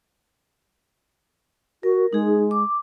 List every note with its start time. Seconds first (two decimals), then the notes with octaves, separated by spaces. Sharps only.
1.83 F#4 A#4
2.13 G#3 D#4 G#4
2.51 D6